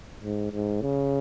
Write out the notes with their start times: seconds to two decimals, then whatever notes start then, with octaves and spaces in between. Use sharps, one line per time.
0.24 G#2
0.52 G#2
0.81 C#3